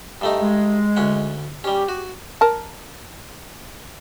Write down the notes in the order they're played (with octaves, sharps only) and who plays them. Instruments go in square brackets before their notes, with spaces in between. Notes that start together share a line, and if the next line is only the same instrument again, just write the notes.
[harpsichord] G2 A3 D#4
[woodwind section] G#3
[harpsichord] D2 C#4 F#5
[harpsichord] G3 C#4 [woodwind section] G4
[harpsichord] F#4
[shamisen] A#4 A5